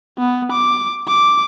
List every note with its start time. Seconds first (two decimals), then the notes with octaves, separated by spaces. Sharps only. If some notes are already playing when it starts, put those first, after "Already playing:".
0.18 B3
0.52 D6
1.08 D6